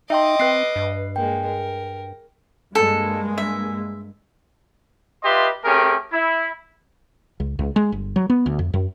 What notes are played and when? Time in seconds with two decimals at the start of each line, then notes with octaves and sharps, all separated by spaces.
0.10 D#4 D#5 E5 G5 C6 D6
0.40 C4 B4 F#6 C7
0.76 G2
1.16 G#3 A#3 G5
1.46 A#4
2.75 G2 G#3 A#3 A4
3.38 E5
5.24 F4 G4 B4 D#5 E5 C6
5.65 A3 C4 C#4 G4 G#4 A#4
6.12 E4
7.40 C#2
7.59 C#2
7.76 G#3
7.92 G1
8.16 F#3
8.30 B3
8.46 D2
8.59 F2
8.74 F#2